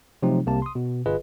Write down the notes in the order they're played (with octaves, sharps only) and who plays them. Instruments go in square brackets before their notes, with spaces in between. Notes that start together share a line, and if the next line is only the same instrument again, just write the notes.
[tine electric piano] C3 F3 F#3 A3 C4 D#4
C2 C3 A#3 G4 A5
C6 D#6
B2
G1 F4 G#4 B4 D#5